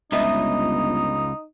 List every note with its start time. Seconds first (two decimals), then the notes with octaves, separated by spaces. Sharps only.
0.12 G1 C#2 D#4 B4 D#5 E5